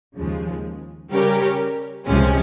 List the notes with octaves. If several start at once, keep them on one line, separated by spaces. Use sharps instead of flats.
D#2 C#3 F3 G#3
C#3 G3 C#4 G4 A#4
C#2 C3 F3 G#3 C#4